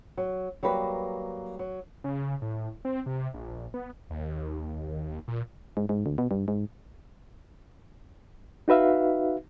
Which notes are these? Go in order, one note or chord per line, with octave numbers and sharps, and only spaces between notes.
F#3
F#3 G3 A#3 B4
F#3
C#3
A2
C4
C3
A#1
B3
D#2
A#2
G#2
G#2
D2
B2
G2
G#2
D#4 F#4 B4 E5 F5